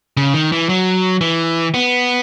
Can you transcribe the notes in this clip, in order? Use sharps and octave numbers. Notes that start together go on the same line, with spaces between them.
C#3
D#3
E3
F#3
E3
B3